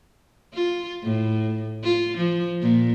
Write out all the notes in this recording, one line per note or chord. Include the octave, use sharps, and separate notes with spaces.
F4
A2
F4
F3
A#2